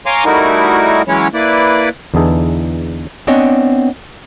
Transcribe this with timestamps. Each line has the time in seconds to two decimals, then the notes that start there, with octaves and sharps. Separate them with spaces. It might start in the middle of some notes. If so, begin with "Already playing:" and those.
0.06 C#5 F5 G#5 A#5 C6 D6
0.25 G3 A3 D#4 E4 F#4 A#4
1.08 E3 F#3 G#3 C#4 E4 C#5
1.34 A#3 E4 B4 D5
2.14 E2 D3 E3 D#4 G#4 A4
3.27 B3 C4 D4 C#5 D#5 G#5